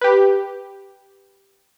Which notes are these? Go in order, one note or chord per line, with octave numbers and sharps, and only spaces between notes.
G4 B4